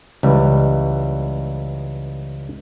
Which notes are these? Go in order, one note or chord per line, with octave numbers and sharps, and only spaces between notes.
C#2 E3 G3